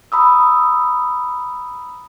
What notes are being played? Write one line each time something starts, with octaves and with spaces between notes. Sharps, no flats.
A#5 B5 D#6 E6